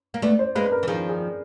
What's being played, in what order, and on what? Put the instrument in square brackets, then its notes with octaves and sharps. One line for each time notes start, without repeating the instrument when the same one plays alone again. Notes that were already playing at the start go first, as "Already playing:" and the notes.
[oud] A#3
[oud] A3 B3 [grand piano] D5
[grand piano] C5
[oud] G#3 A#3 [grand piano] B4
[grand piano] B4
A#4
[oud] E3
[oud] D#3 F3 [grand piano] G#4
[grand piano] G#4